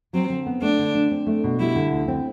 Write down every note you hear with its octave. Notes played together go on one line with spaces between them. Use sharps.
F#3 C4
D3
B3
A3 D4
D3
D4
C4
A3
B2
G3 E4
D3
D2
C4